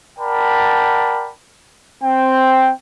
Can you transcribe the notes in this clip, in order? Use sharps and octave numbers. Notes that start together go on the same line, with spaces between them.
A#4 D5 F#5 G5 A5 B5
C4 G5